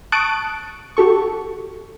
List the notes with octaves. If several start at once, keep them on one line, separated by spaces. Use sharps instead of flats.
A5 C#6 D#6 F#6 D7
F#4 G4 A4 C#6